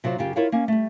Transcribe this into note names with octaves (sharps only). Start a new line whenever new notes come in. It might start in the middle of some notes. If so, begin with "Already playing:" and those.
C3 F#3 F4 C5
F#2 C#3 F4 G4
E4 F4 A#4 C#5 E5 F5
A#3 C#4
G3 A3